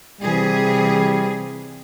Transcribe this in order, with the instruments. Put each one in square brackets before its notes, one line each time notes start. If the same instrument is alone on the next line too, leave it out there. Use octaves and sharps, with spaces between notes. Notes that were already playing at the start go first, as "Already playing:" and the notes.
[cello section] C3 E3 G#4 [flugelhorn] G3